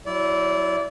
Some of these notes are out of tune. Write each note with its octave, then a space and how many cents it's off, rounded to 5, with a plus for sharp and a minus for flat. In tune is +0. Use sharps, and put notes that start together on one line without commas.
F#3 +0 E4 +0 D5 -25